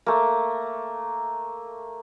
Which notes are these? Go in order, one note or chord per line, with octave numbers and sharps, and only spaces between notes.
A3 A#3